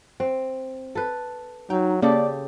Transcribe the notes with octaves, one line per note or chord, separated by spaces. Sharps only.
C4
A4 B4
F#3 D#4 G5
C#3 A#3 G4 A4 D5